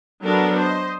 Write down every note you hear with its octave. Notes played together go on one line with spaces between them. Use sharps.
F#3 B3 D4 A4 A#4
C5 D#5